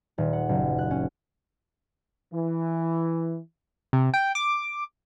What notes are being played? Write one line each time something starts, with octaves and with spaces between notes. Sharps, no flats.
D#1
F#5
F#1
F#6
C#4
E3
C3
G5
D6